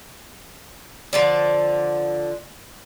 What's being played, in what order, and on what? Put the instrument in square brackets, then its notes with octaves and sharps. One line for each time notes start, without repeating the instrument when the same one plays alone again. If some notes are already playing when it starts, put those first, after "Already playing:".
[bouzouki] D3 F3 D5